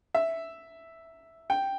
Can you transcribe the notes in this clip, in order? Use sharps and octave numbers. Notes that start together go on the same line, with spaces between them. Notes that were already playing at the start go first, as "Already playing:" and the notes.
E5
G5